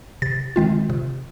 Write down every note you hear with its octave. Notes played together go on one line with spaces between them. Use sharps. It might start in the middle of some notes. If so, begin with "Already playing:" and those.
C3 A6
D#3 G#3 C4 F4
C3